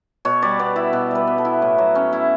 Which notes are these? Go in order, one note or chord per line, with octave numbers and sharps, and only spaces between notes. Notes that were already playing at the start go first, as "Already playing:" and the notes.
B2 C#5
G3 D5
B3 D5
E4 E5
B2
G3 B4
B3
A4
E4
A2
F#3
C#4
E4